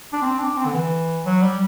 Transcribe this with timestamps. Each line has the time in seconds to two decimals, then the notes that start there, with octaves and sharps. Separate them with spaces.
0.13 D4
0.22 C4
0.39 D4
0.57 C4
0.66 D3
0.74 E3
1.26 F#3
1.42 G3